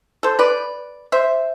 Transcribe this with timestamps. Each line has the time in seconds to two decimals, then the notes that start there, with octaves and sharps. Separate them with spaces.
0.23 A4 C5
0.39 B4 D5
1.12 C5 E5